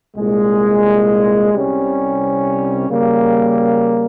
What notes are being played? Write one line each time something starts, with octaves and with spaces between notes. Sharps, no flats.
C2 A#2 G#3
C2 C3 G3 C#4
C#3 G3 A#3